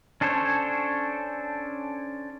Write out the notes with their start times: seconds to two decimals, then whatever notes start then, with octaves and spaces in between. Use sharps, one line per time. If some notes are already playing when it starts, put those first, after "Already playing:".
0.21 C#4 D4 A4 C5 C#5